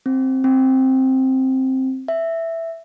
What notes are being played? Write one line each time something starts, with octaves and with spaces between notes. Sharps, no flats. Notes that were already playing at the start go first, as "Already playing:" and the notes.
C4
C4
E5